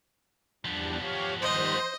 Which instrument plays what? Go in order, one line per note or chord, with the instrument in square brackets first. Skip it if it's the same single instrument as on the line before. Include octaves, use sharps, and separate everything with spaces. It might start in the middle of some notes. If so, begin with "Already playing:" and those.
[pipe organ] E2 G3 D4 [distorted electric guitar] F3 B3
[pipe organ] G4 C#5 F5
[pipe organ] D#3 G3 [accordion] C5 C6 [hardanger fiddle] D#5